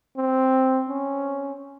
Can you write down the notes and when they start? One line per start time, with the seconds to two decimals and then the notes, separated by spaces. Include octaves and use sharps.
0.17 C4
0.89 C#4